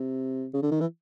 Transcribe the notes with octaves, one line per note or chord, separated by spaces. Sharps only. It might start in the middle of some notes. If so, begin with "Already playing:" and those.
Already playing: C3
C#3
D3
D#3
E3